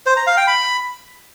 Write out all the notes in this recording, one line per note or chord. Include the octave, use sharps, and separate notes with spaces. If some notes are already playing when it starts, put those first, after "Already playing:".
C5
A#5
F5
G5
B5